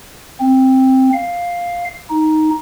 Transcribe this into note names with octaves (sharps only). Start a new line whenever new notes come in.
C4
F5
D#4